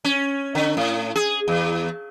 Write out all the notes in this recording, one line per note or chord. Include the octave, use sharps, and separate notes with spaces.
C#4
D3
A2
G#4
E2